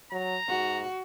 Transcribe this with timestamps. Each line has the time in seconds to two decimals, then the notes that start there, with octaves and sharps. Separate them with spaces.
0.12 F#3 A#5
0.48 G#2 F#4